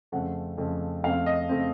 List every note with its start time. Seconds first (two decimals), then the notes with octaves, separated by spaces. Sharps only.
0.12 F2 C#3 A3 C4 F#5
0.58 F2 C#3 A3 C4
1.04 F2 C#3 A3 C4 F5
1.26 D#5
1.49 C#3 A3 C4